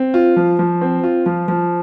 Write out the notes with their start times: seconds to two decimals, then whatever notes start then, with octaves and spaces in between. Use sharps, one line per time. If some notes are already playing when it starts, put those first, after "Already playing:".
Already playing: C4
0.14 F4
0.36 F3
0.59 F3
0.81 C4
1.03 F4
1.26 F3
1.48 F3